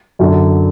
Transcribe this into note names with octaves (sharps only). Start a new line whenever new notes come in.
F#2 D3 F#3